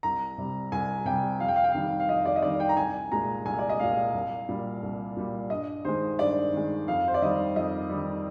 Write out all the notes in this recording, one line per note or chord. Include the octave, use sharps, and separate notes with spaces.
C2 A#5
C3 G3
C2 G#5
C3 G3 G5
F2 F5
G5
F5
G5
D#3 G3 F5
F5
F2 D#5
D5
D#5
D#3 G3 D5
G5
A#5
C2 G#5
A#2 G#3 A#5
C2 G#5
D5
D#5
A#2 G#3 F5
C2
A#2 G3
C2
A#2 G3
G2 D#5
D#3 G#3 C5
G2 D5
D#3 G#3
F2 F5
C5
D5
D#3 G3 D#5
F2 D#5
D#3 G3